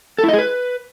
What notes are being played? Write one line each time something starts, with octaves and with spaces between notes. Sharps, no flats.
A4
E4
D#5
G#4
B4